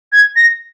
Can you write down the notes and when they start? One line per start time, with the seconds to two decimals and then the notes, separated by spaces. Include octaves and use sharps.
0.12 G#6
0.36 A#6